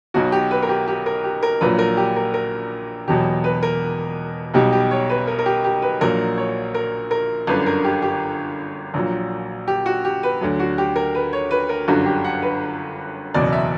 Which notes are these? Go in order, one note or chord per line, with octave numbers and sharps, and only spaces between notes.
B1 B2 F#3 F#4
G4
B4
A#4
G4
G4
A#4
G4
A#4
A#1 A#2 F#3 B4
A#4
G4
A#4
A#4
E1 E2 B2 F#3 G4
B4
A#4
B1 B2 G3 G4
G4
C#5
B4
A#4
A#4
G4
G4
B4
A#1 A#2 F#3 A#4
C#5
A#4
A#4
G1 F#2 D3 B4
A#4
G4
G4
A#1 A#2 F#3
G4
F#4
G4
B4
D2 D3 F#3
F#4
G4
A#4
B4
C#5
B4
A#4
G1 F#2 D3 F#4
G4
F#5
B4
F#1 E2 B2 D5
E5